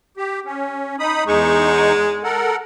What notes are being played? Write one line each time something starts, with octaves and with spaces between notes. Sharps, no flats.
G4
C#4
D#4 B5 D#6
E2 G#3 D#4 C#6
A4 A#4 F#5